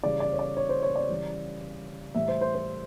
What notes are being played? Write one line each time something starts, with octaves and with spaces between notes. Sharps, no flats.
C#3 E3 G3 D5
D5
C#5
D5
C#5
C5
C#5
D5
C#3 E3 G3
A2 E3 G3 E5
C5
C5
C5